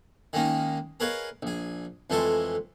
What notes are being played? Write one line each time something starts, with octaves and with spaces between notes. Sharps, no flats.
D#3 G#3 A#3 C#4 D#4
G#4 A#4 B4 C#5 D#5 F5
A#1 G#4
F2 E3 G#3 A3 A4 C6